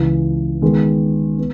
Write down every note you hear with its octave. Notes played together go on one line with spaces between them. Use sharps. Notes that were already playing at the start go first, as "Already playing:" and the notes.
Already playing: C#2 C#3 E3
D#3 G#3 B3
B3